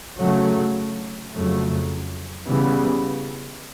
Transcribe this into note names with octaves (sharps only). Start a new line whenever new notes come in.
C#3 F#3 A3
F2 C#3 F#3 A3
C#3 E3 G3 B3